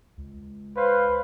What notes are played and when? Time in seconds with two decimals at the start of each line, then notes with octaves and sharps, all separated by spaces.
0.17 C#2
0.76 B4 C5 F5